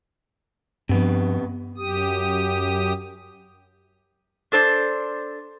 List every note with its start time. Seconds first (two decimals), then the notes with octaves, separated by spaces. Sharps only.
0.89 G2 C3 F3 B3
1.77 F#2 G4 D#6
4.52 D4 A4 C5 D5